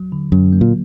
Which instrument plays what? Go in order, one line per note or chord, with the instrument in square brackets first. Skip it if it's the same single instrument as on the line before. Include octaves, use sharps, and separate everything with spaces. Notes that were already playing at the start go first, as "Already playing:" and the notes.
Already playing: [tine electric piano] F#3
D3
[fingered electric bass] F#2 [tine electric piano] F#3
[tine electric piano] A#3
[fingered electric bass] A#2